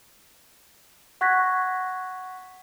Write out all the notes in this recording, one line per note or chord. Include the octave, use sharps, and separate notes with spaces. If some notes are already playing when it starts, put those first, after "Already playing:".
F#5 C#6 F#6 G#6 A#6 B6